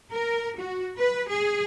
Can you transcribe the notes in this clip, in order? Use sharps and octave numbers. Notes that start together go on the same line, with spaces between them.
A#4
F#4
B4
G#4